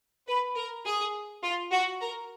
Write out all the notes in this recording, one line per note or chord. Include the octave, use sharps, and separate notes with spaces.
B4
A#4
G#4
F4
F#4
A#4